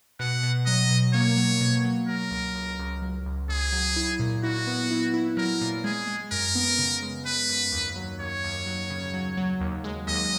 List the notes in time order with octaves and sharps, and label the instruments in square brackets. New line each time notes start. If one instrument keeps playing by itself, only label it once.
[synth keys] B2 [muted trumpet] F#5
[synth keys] B2
[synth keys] F#3 [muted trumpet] D#5
[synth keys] B2
[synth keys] A#3 [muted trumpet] C#5
[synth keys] F#3
B2
F#3
[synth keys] F#3 [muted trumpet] A#4
[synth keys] C#2
C#2
C#2
F#3
C#2
[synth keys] C#2 [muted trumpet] G#4
[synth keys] F#3
E4
A#2
[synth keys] E4 [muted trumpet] F#4
[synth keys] B3
E4
E4
[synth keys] F#3 [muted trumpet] A#4
[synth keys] A#2
[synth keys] G#3 [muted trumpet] G#4
[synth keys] G#3
[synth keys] F#2 [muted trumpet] A#4
[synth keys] B3
C#3
G#3
[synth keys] G#3 [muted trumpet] B4
[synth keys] F#2
D#2
F#3
[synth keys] D#2 [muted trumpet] C#5
[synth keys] D#2
F#3
C#3
F#3
F#3
D#2
G#3
[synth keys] D#2 [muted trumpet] D#5